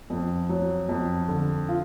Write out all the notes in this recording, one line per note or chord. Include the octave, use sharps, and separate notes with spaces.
F2
F#3
F2
D3
F4